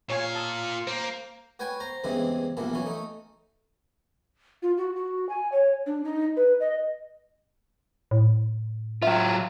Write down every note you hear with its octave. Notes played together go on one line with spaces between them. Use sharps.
A#2 C#5 F5 G#5
A5 D#6 E6
A#3 C5
F#4 B4 C#5 G5 G#5
C5 A#5
E2 G2 C#3 E3 G#3 C4
A#1 G2 B2 E3 A#3
E3 F#3 C#4
A3 D#4
F4
F#4
F#4
G#5
C#5
D4
D#4
B4
D#5
A2
F#3 F4 E5 G5